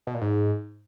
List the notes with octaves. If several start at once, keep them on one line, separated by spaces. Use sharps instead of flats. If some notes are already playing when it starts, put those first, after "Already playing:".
B2
A#2
G#2